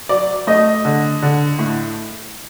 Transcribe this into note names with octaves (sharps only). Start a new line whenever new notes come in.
F#3 D5
A3 D#5
D3
D3
A2